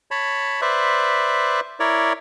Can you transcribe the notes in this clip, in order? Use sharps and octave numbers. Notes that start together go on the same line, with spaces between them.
C#5 A5 B5
B4 C5 D5 E5
E4 A#4 C#5 D5